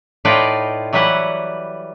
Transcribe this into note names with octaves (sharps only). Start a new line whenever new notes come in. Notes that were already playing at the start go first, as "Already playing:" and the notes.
A2 D#4 F4 B4 D5 G5
E3 F#3 G3 B4 F#5